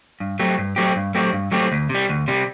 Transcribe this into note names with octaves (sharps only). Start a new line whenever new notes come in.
G2
F#3 A3 C4 G4
G2
F#3 A3 C4 G4
G2
F#3 A3 C4 G4
G2
F#3 A3 C4 G4
D2
C3
G3
D2
C3 G3